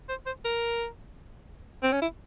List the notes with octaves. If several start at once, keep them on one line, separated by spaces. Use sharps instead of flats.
C5
C5
A#4
C4
C#4
E4